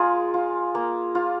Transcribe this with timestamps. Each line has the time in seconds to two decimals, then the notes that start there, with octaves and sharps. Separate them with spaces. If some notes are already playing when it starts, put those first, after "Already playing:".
Already playing: G#3 F4 G#4 A#4
0.34 F4
0.75 A#3
1.15 F4